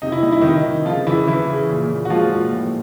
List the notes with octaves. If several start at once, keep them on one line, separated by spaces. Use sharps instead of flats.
C3 D#4
E4
G3 D#4
E4
C3 D#3 D#4
D#3
C#3 F3 F4
C#3 E3 E4
C#3 E3 E4
C#3
A#2
A#2
F#4
F3 G#3 F4
A#2
A2